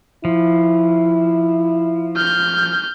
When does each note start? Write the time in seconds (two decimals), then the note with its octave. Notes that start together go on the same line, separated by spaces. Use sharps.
0.25 F3 E4
2.16 F6 G6